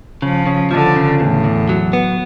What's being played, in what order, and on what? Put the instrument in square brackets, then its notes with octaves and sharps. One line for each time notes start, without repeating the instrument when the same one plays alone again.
[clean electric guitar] C#3 [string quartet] F3
[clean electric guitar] C#3
[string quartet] D3 [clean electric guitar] F3
[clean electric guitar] C#3
[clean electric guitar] E2 [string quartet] A2
[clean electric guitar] E2
F#3
B3